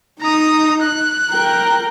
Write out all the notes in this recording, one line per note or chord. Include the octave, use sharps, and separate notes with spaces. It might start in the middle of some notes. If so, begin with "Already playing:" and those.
D#4 A#5 D#6
F#6
A#4 G5